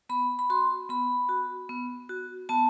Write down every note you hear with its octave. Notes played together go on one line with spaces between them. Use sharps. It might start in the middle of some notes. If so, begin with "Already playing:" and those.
B3 B5
B5
F#4 C6
B3 B5
F#4
B3
F#4
B3 A5